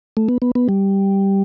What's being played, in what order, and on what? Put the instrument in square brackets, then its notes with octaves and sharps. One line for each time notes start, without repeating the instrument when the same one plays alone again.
[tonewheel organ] A3
B3
B3
B3
G3